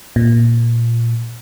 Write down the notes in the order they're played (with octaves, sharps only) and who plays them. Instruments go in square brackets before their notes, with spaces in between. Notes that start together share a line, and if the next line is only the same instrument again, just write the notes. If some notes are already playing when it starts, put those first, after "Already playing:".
[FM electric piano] A#2